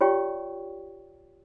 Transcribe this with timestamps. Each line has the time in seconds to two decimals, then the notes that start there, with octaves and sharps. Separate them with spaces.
0.01 F4 G4 C#5 D5 G5 C#6